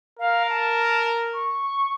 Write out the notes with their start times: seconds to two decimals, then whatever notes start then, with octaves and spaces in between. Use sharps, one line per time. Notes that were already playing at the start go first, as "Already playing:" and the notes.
0.19 A#4 F5
0.49 A5
1.34 C#6